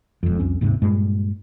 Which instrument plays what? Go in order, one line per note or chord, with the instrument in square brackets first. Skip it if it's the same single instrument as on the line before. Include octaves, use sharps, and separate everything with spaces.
[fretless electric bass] E1 F2
C2 F2 C#4 D4
D#1 G#2 C3
G2 A#2 G#3